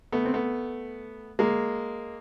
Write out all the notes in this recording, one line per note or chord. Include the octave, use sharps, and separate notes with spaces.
A3 B3
C4
A3 B3
G#3 A#3